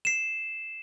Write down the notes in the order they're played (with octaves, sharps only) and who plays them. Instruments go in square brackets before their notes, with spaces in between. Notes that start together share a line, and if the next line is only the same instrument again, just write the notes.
[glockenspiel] C7 E7